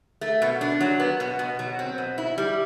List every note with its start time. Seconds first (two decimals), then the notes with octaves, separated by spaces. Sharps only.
0.21 A3
0.42 B2
0.61 D4
0.81 F#3
1.00 B3
1.20 B2
1.39 B2
1.59 F#3
1.79 C4
1.98 B2
2.18 E4
2.38 G3